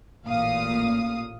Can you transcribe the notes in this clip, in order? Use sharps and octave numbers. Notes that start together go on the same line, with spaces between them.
A1 A#2 F5 D#6